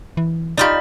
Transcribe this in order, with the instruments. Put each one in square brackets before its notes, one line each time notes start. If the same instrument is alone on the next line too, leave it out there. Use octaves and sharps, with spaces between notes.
[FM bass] E3
[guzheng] D#4 F4 G4 [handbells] D5 B5